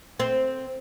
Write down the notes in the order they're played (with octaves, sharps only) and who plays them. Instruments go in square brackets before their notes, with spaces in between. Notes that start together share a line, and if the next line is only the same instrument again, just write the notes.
[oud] C4